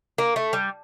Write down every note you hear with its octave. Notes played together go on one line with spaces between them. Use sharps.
A#3
A3
G3